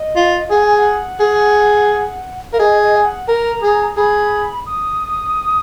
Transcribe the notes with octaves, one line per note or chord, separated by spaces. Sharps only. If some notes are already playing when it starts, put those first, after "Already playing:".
Already playing: D#5
F4
G#4 F#5
G#5
F#5
G#4
A#4 F5
G#4 D#5
D#5
G#5
F#5
A#4 A#5
G#4
G#4 B5
D#6